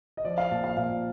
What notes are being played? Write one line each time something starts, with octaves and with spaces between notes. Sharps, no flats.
D#5
F3 D5
F5
A#2 A5
F5
A#2 F5